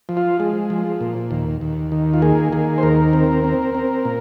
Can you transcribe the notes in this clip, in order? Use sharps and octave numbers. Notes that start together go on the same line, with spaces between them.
F3
F4
G#3
F3
A#2
D#2
D#2
D#3
F4
A#3 G#4
D#3 G#4
C5
D#2 A#4
C4
C4
C4
A#2